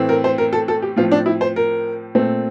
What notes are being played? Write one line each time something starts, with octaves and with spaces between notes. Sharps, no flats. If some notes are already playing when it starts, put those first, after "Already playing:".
Already playing: A2 E3 A3 C4
A#4
C5
A#4
A4
A4
G4
A2 F3 C4 F4
D4
E4
C5
A#4
A#2 A3 C4